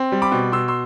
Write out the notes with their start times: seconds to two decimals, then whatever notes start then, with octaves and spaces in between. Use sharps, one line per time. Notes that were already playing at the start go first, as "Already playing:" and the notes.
Already playing: C4
0.12 G3
0.22 B5 D6
0.32 B2
0.52 B2 C6 E6
0.68 C6 E6